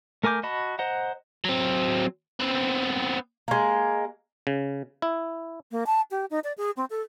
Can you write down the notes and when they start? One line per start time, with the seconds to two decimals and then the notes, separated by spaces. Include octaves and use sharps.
0.24 A3 A#4 G#5 D6 G6
0.43 F#4 D#5 A5 B5
0.79 C5 D#5 F#5 A#5
1.45 F#3 C4
2.40 B3 C4
3.48 G#3 A#3
4.47 C#3
5.02 E4
5.71 A#3
5.86 A5
6.11 G4
6.30 D#4
6.44 D5
6.58 G#4
6.77 C4
6.90 A4